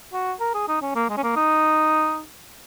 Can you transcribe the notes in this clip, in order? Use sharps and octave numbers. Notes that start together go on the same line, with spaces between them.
F#4
A#4
G#4
D#4
C#4
A#3
G#3
C#4
A#3
D#4